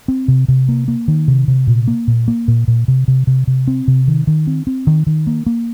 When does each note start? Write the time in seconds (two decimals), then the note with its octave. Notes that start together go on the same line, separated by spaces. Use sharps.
0.08 C4
0.28 C3
0.48 C3
0.69 A#3
0.88 A#3
1.08 D#3
1.28 C3
1.48 C3
1.67 A#2
1.88 A#3
2.08 A#2
2.28 A#3
2.48 A#2
2.68 A#2
2.88 C3
3.08 C3
3.27 C3
3.47 C3
3.67 C4
3.88 C3
4.08 D#3
4.27 D#3
4.47 C4
4.67 C4
4.87 D#3
5.07 D#3
5.27 A#3
5.46 A#3